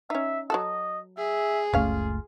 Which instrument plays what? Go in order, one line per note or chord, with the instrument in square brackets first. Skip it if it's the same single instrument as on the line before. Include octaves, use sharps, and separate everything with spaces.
[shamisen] C#4 D#4 [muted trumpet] E5
[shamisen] F#3 F#4 A4 [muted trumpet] D#5
[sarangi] G#4 [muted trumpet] E5
[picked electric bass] F#1 C#2 A3 [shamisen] C#4 F5 [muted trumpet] F4